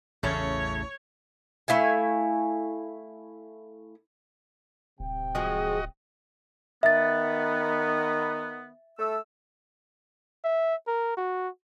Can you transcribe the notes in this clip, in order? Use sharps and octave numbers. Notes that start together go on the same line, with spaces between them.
A1 E2 C#3 E3 A3 C#4 C#5
A3 E4 F5 G#5
D1 C3 G5
F3 G#3 F#4 G#4 D#5
D#3 B3 E5 A6
A3 E6
E5
A#4
F#4